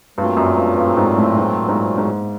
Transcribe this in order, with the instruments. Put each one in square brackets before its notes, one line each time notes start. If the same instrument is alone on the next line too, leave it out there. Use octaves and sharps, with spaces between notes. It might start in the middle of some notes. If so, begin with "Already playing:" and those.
[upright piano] G2 [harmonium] A#2 F#3 A3 C4 F4
[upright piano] F#2
G2
G2
G#2
A2
G#2
G#2
G#2